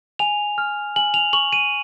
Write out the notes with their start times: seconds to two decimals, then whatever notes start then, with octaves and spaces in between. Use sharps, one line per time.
0.19 G#5 F7
0.58 F6
0.96 G#5 F#7
1.14 F7
1.33 C#6 F#7
1.53 D#7